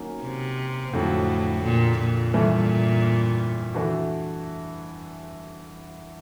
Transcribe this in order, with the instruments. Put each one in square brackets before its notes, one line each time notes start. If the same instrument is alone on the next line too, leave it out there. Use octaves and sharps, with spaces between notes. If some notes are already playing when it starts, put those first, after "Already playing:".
Already playing: [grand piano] D#3 F#3 A#3 C#4
[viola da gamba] C3
[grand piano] F2 D3 F#3 [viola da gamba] A2
[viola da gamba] A#2
A#2
[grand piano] G2 E3 A3
E3 A3 D4 F#4